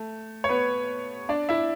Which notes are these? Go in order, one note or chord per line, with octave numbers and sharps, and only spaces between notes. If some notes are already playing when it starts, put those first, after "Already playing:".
Already playing: A3
C#5
B3 B4
D4 D5
E4 E5